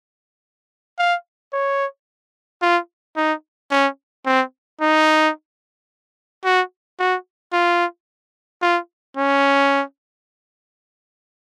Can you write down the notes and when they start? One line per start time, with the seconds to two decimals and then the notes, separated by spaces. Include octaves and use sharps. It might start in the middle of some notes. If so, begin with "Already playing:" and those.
0.98 F5
1.53 C#5
2.62 F4
3.16 D#4
3.71 C#4
4.26 C4
4.81 D#4
6.45 F#4
6.99 F#4
7.53 F4
8.62 F4
9.17 C#4